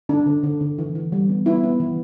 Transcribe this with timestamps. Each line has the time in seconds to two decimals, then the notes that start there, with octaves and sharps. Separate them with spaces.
0.09 D3 D4
0.26 D3
0.43 D3
0.61 D3
0.78 E3
0.95 E3
1.12 G3
1.29 B3
1.46 B3 E4
1.64 B3
1.80 E3